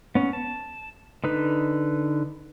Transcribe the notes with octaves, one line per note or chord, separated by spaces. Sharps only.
B3 C#4
A5
D3 D#4 B4